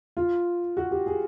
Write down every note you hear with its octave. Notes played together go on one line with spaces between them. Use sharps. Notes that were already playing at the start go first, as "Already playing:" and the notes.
F4
F#4
G4
G#4